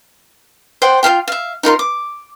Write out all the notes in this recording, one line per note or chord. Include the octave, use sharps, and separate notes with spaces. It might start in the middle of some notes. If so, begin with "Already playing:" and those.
C5 D5 F#5 G5
F4 A4 F5 G5
E5 F5
D#4 F4 A#4 C6
D6